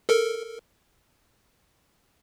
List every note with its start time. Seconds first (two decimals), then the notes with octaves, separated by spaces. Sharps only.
0.09 A4 A#4